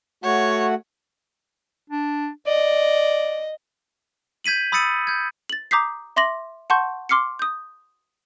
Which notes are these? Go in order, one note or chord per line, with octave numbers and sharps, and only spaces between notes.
A3 F#4 C#5 F#5
D4
D5 D#5
G6 G#6 B6 D#7 F#7
B5 D#6 E6 A6 C#7 D#7
G6 G#6
A6 F#7
A#5 D6 D#6 G6 B6 C7
E5 C6 D6 A#6 F#7
F#5 A5 C6 C#6 G6
C6 D6 F6 C7 C#7
D#6 G6